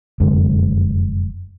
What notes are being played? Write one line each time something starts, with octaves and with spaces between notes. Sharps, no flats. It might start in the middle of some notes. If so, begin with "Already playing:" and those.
F1 F#2 D3 G#3